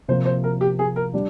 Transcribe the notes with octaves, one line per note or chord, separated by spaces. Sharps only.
C3 F3 A#3 C5
C5
A#4
G4
G#4
A#4
G3 D4